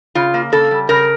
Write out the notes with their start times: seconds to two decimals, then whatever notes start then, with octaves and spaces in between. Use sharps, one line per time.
0.15 C#3 F4
0.34 A#3
0.52 C#3 A4
0.71 G3
0.89 C#3 A#4